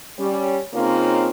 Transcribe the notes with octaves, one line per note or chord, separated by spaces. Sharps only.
G3 C#4
C#3 A#3 C4 C#4 D#4 F4